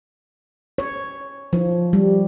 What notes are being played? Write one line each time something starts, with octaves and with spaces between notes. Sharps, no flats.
C#5
F3
G3